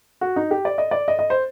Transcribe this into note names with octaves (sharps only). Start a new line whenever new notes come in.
F#4
D#4
G4
D5
D#5
D5
D#5
D#5
C5